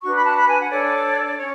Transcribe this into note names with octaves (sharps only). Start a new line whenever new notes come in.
D4 F#4 B4 C#6
B5
A5
B5
G#5
F#5
D4 A4 C#5 D5
C#4 C#5